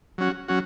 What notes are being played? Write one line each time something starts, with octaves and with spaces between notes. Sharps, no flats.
F#3 C#4 F#4
F#3 C#4 F#4